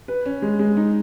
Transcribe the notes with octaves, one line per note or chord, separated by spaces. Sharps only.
B4
C#4
G#3
G#3
D#4